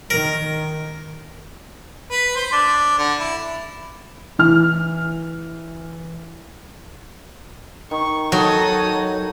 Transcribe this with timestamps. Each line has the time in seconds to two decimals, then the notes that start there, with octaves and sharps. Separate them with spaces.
0.10 D#3 A#4
2.11 B4
2.36 C5
2.52 D4
2.98 D3
3.20 E4
4.39 E3 F6
7.91 D#3 C#6
8.32 F#3 D#4 A4 C#5 D#6